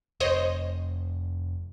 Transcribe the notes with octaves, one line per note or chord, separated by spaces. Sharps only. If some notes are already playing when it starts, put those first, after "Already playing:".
F1 C5 C#5 D#5